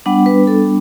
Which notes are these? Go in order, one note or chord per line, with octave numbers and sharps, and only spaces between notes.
G3 B3 D4 F#5
B4
A4